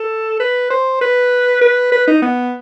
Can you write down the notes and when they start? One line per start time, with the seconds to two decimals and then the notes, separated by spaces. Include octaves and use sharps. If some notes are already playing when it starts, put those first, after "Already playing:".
Already playing: A4
0.40 B4
0.70 C5
1.01 B4
1.62 B4
1.92 B4
2.08 D#4
2.22 B3